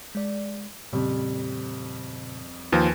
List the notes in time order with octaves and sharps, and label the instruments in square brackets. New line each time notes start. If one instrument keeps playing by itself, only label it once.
[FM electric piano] G#3 D5
[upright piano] F2 G3 [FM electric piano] A#2 C#3
[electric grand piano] D#2 F3 [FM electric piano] B4 G#5